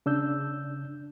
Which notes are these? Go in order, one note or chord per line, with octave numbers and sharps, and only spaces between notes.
C#3 D4 E6 G6